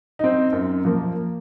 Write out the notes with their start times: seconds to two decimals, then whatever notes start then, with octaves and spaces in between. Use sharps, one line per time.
0.19 C4 D#4
0.52 F#2
0.85 F3 A#3